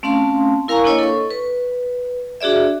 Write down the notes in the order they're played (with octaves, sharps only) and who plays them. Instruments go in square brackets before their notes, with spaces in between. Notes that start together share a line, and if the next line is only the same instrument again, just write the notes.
[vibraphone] A3 C4 C#4 F5 A5 C6
E4 A#4 F5 G#5 A#5 C#6
A#3 D4 E4 C#5 D#5
A4 C#6
B4
D4 F#4 G#4 D5 E5